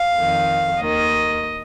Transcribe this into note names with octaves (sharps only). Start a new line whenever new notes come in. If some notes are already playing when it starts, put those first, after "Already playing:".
Already playing: F5
F2 D#3
D#2 D#3 D#5